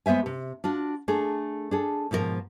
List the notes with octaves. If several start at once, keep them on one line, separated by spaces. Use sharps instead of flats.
G#3 B3 C5 E5 G#5
C3
D4 F4 F#4
A3 D4 G#4
D4 G#4 A4
G#2 B2 F3 G4 A#4